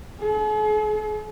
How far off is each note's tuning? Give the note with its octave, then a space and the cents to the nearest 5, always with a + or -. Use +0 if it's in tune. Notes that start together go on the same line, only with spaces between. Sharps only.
G#4 +45